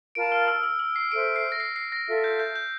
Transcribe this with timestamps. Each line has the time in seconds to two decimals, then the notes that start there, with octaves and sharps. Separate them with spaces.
0.15 F4 A#4 F5 A5 D7
0.32 F6
0.48 E6
0.63 E6
0.79 E6
0.96 C7
1.12 A4 C5 E5 D7
1.36 C7
1.52 A#6
1.60 C7
1.76 C7
1.92 A#6
2.08 F4 A4 E5
2.24 G6
2.40 G6
2.56 G6